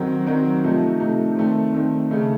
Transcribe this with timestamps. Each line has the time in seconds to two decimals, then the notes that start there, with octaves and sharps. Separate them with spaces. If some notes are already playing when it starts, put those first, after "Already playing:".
Already playing: D#3 F#3 C4 D#4 A#4
0.26 D#3 F#3 C4 D#4 A#4
0.64 C3 F3 A3 D#4
1.00 C3 F3 A3 D#4
1.36 D#3 A3 C4
1.73 D#3 A3 C4
2.10 C#3 A3 D#4